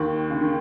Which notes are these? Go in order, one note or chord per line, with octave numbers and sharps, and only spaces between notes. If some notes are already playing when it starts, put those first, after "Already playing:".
Already playing: D#2 D#3
C#3
D#3